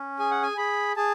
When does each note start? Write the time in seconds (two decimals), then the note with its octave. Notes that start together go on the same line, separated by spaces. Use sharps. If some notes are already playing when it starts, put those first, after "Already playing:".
Already playing: C#4
0.19 G#4 G#5
0.31 F#5
0.42 G#5
0.57 G#4 B5
0.96 G#4 A5